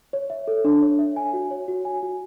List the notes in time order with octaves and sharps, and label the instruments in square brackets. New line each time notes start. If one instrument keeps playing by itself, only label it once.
[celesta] C#5
E5
A4
D4
C#5
E5
G#5
F#4
C#5
F#4
G#5
F#4